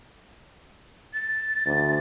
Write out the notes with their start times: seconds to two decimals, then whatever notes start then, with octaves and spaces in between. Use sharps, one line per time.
1.13 A6
1.66 D2